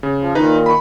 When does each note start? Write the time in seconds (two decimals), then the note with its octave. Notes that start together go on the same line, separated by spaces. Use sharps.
0.03 C#3
0.20 F3
0.35 A#2 D#3 D#4 B4
0.66 B5 C#6